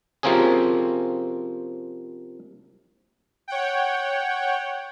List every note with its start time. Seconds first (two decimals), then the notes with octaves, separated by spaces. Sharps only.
0.23 C3 F3 A#3 C4 C#4 G#4
3.48 C#5 F#5 G5